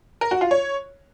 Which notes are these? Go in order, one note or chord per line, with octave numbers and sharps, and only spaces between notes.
A#4
F#4
F4
C#5